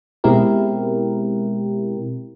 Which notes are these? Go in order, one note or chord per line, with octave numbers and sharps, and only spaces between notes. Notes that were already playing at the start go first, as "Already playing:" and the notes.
B2 G#3 C4 E4 G4 A#4